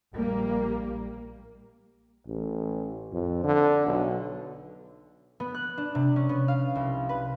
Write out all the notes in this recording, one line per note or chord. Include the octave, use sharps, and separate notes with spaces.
A#1 G3 A#3
A1
F2
D3
B1
B3
F#6
D4
C3
C#4
B3
F5
C2
B4